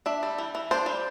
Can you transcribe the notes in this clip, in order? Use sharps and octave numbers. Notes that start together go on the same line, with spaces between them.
D4 E5
G3
E3
E3
D4 C5
G3